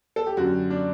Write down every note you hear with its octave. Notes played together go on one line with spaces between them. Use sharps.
A4
G4
F#2 D3 F#4
D4